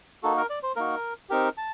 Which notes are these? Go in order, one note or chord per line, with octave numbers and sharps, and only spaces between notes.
A#3 D#4 F#4 A4
A#4
D5
C5
A#3 D#4 F#4 A#4
C4 D#4 G4 A#4
A5